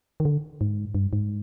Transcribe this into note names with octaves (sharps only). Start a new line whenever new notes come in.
D#3
D3
G#2
G2
G#2